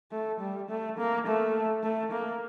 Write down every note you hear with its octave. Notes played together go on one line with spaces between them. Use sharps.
A3
G3
A3
A#3
A3
A3
A#3